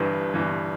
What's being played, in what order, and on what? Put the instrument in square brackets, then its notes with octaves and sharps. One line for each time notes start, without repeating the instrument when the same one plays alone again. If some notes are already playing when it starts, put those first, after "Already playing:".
Already playing: [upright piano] G1 G2 E3
G1 G2 E3